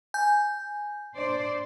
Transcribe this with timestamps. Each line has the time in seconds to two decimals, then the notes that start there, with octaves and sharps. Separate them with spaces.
0.14 G#5 G6
1.16 D4 C5 D5